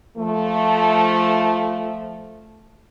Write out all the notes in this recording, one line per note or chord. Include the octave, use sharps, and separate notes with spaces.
F3 A3